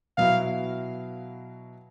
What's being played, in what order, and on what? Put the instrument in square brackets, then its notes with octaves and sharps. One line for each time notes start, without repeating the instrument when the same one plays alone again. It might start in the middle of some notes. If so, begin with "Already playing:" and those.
[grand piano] B2 F#3 B3 E4 [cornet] F5